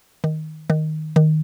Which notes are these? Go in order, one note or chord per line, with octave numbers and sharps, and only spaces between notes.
D#3
D#3
D#3